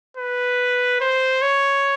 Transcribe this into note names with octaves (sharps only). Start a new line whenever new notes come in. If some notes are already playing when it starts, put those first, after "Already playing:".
B4
C5
C#5